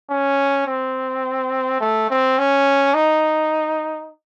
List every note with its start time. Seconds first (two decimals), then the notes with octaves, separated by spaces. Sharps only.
0.11 C#4
0.67 C4
1.81 A3
2.10 C4
2.39 C#4
2.94 D#4